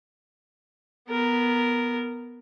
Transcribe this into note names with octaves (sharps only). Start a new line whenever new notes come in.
B3 A#4